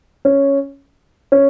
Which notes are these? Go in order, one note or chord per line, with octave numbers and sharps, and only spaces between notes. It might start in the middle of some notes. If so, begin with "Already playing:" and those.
C#4
C#4